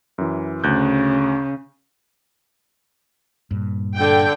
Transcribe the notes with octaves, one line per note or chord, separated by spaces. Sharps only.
F#2 E3
D2 C#3 F#6 G6
G2 A#2
D3 G5